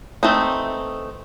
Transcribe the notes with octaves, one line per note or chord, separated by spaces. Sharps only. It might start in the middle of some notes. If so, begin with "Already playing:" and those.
E3 A3 C4 D#4